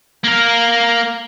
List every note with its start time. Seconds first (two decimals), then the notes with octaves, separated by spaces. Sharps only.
0.24 A#3 A#4